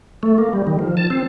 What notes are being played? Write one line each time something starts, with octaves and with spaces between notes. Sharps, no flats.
A3
A#3
G3
D#3
F3
A5
C4